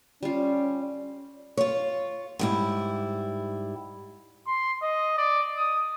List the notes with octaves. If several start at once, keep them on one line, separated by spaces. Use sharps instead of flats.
G3 C#4 F4
F4 C#5
G#2 G3 E4
C6
D#5
D5
D#6